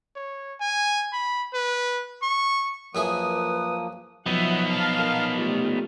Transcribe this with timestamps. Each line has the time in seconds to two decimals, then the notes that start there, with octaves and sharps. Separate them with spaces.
0.16 C#5
0.60 G#5
1.13 B5
1.54 B4
2.23 C#6
2.95 F#2 F3 A#3 E4 G#4 B4 D#6
4.26 F3 F#3 B3 D#4 E5 F#5
4.69 F5 A5
4.99 A#4
5.35 G3 A3 F4